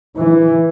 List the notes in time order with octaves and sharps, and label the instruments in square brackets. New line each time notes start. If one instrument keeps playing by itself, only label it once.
[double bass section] E3